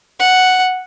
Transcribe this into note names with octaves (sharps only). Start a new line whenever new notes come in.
F#5